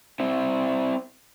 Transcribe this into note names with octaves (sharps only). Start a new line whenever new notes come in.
C4 E4